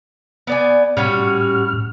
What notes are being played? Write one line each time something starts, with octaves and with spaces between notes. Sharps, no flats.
B3 D5 G#5
A2 G3 C#4 F#4 F6